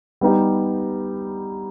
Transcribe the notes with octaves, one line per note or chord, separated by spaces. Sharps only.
G3 B3 D#4 G4